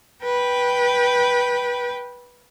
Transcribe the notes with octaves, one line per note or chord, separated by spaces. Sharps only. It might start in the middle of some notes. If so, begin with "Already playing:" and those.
B4 G5